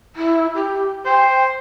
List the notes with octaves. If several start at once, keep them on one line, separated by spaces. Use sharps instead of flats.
E4
G4
C5 G5